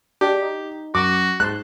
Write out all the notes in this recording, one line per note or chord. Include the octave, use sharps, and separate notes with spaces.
G#3 D4 G4
D#4
F#2 F#4 D6
G#2 A5 C6 F#6